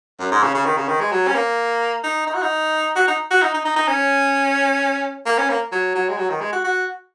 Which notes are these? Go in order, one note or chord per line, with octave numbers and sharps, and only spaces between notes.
F#2
G#2
C#3
C#3
D#3
C#3
D#3
G#3
F#3
C#4
A#3
D#4
D#4
F#4
D#4
F#4
D#4
F#4
D#4
D#4
D#4
D#4
C#4
A#3
C#4
A#3
F#3
F#3
G#3
F#3
D#3
G#3
F#4
F#4